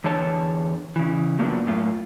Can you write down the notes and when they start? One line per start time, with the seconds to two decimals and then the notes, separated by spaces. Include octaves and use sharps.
0.04 E2 D3 C#5 A5
0.96 C#3 E3
1.39 F3 F#3 A#3 B3 D4
1.66 F#2 A2 F4